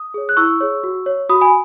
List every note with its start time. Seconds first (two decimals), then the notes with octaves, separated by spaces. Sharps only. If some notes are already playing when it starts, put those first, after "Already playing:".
Already playing: D#6
0.14 G#4 C#5
0.29 F#6
0.37 E4 C#6 E6
0.61 G#4 C#5
0.84 F#4
1.06 C#5
1.29 F#4 B5 D#6
1.41 G#5 B5